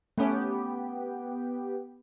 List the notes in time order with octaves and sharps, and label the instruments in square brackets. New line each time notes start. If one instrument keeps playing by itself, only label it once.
[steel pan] A3 C#4 [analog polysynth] B3 G4